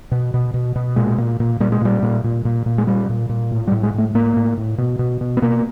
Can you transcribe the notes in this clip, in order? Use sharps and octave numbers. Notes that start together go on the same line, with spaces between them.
B2
B2
B2
B2
A#2 G#3
A#2
A#2
A#2 G3
G#3
A#2 G3
A#2
A#2
A#2
A#2
G#3
A#2 G3
A#2
A#2
A2
G3
A2
G#3
A2 A3
A2 A#3
A2
A2
B2
B2
B2
B3
B2 A#3